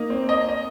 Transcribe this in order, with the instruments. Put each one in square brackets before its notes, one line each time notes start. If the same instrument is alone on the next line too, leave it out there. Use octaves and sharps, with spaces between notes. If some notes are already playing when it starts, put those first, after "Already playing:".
Already playing: [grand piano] A#3 D#4
C4
D#5
D#5